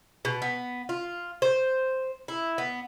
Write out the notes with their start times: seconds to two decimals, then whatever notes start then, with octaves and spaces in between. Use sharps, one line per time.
0.25 B2
0.42 B3
0.89 F4
1.42 C5
2.28 E4
2.58 B3